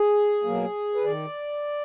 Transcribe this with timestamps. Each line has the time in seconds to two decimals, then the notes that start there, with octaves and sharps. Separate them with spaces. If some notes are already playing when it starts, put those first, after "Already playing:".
Already playing: G#4
0.44 B2 F#3 A#3
0.95 B4
1.05 D#3 D5